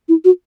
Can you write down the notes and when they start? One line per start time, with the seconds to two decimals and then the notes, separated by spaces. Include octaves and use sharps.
0.09 E4
0.25 F#4